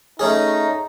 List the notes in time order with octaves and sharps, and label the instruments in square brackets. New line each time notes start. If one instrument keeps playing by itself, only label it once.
[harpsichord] A3 C#4 G#4 [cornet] D#4